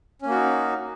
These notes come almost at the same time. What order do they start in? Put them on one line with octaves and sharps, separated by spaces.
C#4 A#3 F#4 D#4